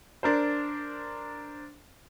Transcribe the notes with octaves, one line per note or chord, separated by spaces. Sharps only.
D4 A#4 C5